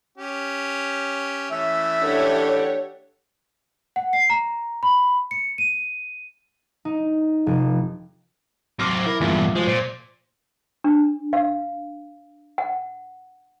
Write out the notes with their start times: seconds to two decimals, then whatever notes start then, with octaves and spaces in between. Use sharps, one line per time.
0.18 C#4 G4
1.51 E3 A3 C#4 E5
2.02 D4 G4 A4 C#5 F#5
3.96 F#5
4.13 C7
4.30 A#5
4.83 B5
5.31 C#7
5.58 D#7
6.85 D#4
7.47 F1
8.79 F#3 C4 D6 F6 A#6
9.06 E4 A#4
9.21 E2 G2 A#2 E5
9.55 F3 F#3 G#3
9.67 A#2 C5 D7
10.84 D4
11.33 F5
12.58 F#5